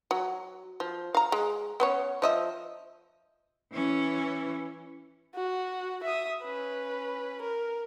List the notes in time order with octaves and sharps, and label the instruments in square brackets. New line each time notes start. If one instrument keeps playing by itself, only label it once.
[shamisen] F#3
F3
F5 A#5
G#3
B3 C#4 C#5
F3 D#5 E5
[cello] E3 C#4
[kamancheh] F#4
E5 D#6
C#4 B4
A#4